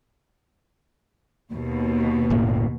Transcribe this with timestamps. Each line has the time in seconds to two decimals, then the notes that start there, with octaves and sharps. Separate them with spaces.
1.53 D#2 B2
2.30 F#1 A2 A#3